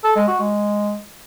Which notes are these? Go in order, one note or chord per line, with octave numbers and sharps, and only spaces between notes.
A4
G#3
F#4
G#3